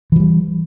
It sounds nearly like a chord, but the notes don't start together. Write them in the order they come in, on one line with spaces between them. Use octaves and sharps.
E3 F3 G3